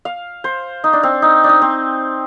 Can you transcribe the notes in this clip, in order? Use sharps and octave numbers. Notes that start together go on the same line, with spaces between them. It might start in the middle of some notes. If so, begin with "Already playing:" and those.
F5
C5
D#4
D4
C4
D#4
D4
D#4
C4